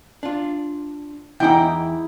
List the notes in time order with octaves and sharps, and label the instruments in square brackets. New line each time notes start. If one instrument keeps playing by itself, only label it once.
[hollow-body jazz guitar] D4 F4
[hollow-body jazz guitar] E2 E3 F#5 [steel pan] D#4 G5 [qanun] E4